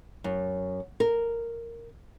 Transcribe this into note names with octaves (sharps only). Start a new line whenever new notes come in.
F#2
A#4